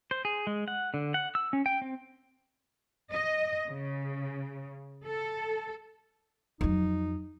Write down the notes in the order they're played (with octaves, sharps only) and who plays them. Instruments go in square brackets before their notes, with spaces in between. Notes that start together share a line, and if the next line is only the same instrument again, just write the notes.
[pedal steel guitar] C5
G#4
G#3
F#5
D3
F#5
E6
C#4
G5
C4
[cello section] D#5
C#3
A4
[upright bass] F2 F#3 [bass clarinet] D#4